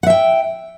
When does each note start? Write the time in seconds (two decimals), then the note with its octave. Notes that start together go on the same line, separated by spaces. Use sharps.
0.03 F#5
0.07 E5
0.10 G5